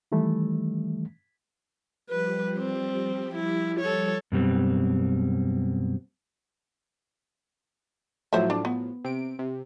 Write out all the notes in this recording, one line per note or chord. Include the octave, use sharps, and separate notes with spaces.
D#3 E3 G3 A3
F3 G3 G4 B4
C4
E4
A4 C#5
F#2 B2 G3 C4
A2 F3 F#3 C5 E5
D4
B3
C3 D7
C3